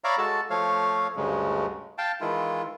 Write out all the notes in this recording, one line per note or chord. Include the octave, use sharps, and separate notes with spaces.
C#5 D5 E5 F5 A#5 B5
G#3 F#4 A4 A5
F3 A3 C#5 F5
D2 G2 C#3 G#3
F5 G5 A5
D#3 E3 G#3 E4 F4